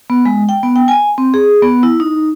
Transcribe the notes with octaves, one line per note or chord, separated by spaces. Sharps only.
B3
G#3
G5
B3
G5
G#5
C4
G#4
B3
E4
D#4